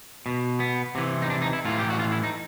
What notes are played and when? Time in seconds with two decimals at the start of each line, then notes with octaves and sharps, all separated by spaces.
0.26 B2
0.60 B3
0.95 C3 E3
1.22 D#4
1.30 D4
1.42 D#4
1.53 E4
1.65 A2 E3 F4
1.79 G4
1.90 F#4
1.99 F4
2.12 E4
2.23 D#4